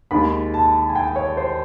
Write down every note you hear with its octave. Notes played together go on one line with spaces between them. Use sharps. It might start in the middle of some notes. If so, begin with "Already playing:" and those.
D#2 D#3 G#3 B5
A5
G#5
G5
C#5
C5